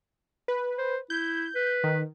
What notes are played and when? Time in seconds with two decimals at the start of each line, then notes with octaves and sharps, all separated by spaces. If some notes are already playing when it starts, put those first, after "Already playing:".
0.48 B4
0.78 C5
1.10 E4 G6
1.55 B4
1.84 D#3